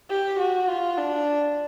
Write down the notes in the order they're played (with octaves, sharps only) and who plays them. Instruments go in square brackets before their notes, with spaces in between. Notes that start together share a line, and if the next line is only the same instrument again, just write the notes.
[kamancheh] G4
F#4
F4
D4